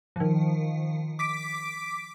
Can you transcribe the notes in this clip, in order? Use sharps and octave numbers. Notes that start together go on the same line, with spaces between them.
D#3 F3
D6 B6 D7